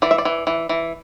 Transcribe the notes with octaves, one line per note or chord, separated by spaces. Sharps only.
E3 D5
E5
D5
E3
E3
E3